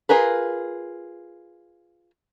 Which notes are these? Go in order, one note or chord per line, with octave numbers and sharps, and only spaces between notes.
F4 G#4 A#4 B4